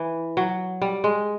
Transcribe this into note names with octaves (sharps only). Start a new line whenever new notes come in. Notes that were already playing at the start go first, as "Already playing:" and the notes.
Already playing: E3
F#3
G3
G#3